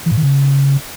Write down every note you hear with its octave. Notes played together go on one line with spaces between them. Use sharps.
E3
A2
D#3
C#3